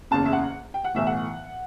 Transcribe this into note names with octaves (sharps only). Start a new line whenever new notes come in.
F#1 E2 C#3 A5
E5
F#5
G5
F#5
B1 A2 E3 E5
F#5